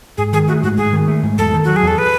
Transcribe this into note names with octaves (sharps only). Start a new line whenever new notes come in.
G#2 G#4
D#3 G#4
A3 F#4
G#2 F#4
G#2 G#4
D#3
A3
G#2
E2 A4
D#3
F#3 F#4
G#4
E2 A4
B4